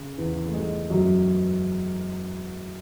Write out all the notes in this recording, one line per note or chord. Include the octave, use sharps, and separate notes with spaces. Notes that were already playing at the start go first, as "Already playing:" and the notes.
Already playing: C#3
E2 E3
A3
G#2 G#3
F#2 F#3